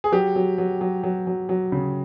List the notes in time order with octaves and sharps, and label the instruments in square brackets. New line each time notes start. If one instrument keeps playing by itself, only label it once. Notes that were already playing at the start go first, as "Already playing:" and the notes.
[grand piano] G#4
F#3 G4
F#3
F#3
F#3
F#3
F#3
F#3
C#3